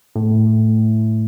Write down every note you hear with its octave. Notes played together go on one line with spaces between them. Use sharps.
A2